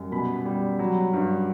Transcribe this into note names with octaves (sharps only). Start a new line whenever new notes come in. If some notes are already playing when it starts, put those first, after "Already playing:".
Already playing: F#2 G3
B2 B5
G3
F#3
G2